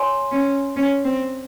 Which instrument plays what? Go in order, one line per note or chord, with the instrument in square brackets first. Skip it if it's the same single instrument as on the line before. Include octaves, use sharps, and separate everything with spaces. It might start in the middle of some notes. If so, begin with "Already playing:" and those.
Already playing: [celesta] C#5 G#5 C6
[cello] C#4
C#4
C4